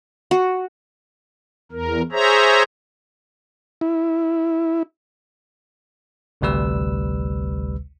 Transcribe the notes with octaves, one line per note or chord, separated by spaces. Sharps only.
F#4
E2 A#4
G#4 C5 C#5 E5 A#5
E4
A1 D2 C3 G3 B4 E6